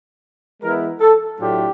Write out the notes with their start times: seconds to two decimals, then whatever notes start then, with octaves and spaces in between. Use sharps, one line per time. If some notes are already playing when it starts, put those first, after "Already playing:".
0.62 E3 G#3 B3 E4 A#4
1.00 A4
1.39 A2 F#3 A3 D4 F4 G4